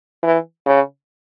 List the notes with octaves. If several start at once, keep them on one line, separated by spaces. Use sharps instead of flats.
E3
C#3